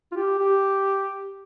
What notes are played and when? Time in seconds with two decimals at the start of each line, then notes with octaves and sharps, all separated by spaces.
0.12 F4
0.16 G4
0.39 G4